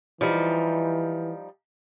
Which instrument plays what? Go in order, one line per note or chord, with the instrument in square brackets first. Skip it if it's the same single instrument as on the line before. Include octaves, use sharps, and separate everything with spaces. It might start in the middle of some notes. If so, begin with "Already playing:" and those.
[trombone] E3 [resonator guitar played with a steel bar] F3 G3 D#4